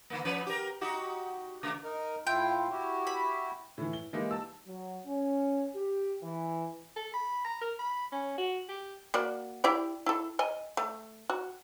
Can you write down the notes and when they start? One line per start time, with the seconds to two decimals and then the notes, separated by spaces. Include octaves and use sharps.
0.10 D3 A#3
0.25 F3 C#4 B4
0.46 G4 A#4
0.81 D#4 F#4 G4
1.63 C#3 A3
1.84 D#4 A#4
2.27 A2 E4 F4 G5
2.70 E4 F#4 G4
3.07 B5
3.78 A2 E3
3.93 G7
4.13 E3 G#3 A#3 D#4 E4 G4
4.31 A5 E6
4.67 F#3
5.07 C#4
5.75 G4
6.23 E3
6.96 A4
7.14 B5
7.45 A#5
7.61 A#4
7.79 B5
8.12 C#4
8.38 F#4
8.69 G4
9.14 A#3 F#4 D5
9.64 E4 G4 D5
10.06 E4 A4
10.39 D#5 G#5
10.77 A3
11.30 F#4